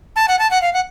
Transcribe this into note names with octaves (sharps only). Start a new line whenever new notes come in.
A5
F#5
A5
F#5
F5
F#5